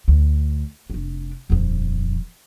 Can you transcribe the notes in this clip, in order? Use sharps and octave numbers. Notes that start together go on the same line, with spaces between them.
D2
F1 D4
D#1 F2